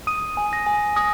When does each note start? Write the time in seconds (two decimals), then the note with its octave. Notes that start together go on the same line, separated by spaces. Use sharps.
0.07 D#6 D#7
0.37 G#5
0.53 A#6
0.67 G#5
0.96 D#6 A#6